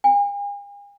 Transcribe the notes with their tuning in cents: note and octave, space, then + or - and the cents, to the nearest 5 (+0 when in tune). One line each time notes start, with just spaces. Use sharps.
G#5 -45